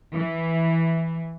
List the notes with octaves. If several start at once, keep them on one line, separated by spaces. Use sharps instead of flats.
E3